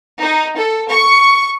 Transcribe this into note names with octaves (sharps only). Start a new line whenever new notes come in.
D#4
A4
C#6